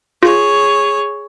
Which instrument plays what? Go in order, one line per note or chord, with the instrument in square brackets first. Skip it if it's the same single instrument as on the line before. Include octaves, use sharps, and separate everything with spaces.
[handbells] F4 [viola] G#4 C#5